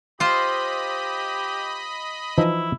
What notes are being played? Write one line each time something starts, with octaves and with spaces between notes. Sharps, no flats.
F4 G4 C5 D#5 B5
E3 F3 D#4 E4